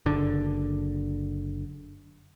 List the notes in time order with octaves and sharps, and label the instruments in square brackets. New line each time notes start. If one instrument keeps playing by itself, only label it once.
[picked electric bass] F#1 D3